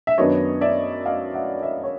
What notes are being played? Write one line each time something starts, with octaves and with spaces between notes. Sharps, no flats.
E5
F#2 D#3 F#3 B3 D4 C#5 D#5
D5 E5
D#5 F5
E5 F#5
D5 E5
C#5